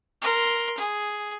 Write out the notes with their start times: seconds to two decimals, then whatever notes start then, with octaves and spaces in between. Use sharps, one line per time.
0.22 A#4 C6
0.77 G#4